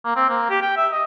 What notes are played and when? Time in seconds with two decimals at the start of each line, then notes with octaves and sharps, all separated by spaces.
0.04 A#3
0.17 C4
0.29 A#3
0.50 G4
0.62 G5
0.77 E5
0.92 D#5